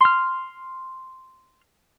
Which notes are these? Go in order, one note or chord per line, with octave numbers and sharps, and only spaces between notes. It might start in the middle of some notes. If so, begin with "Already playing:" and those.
C6 F6